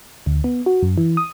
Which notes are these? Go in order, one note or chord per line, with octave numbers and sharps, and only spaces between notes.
D2
B3
F#4
F#2
E3
D#6